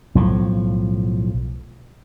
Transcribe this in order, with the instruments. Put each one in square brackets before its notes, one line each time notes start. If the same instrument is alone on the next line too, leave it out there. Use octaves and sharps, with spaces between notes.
[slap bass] B1 A2 F3